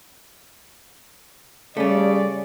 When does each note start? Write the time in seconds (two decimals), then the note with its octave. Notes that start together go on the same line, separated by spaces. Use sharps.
1.77 C#3 G3 A3 C#4 D5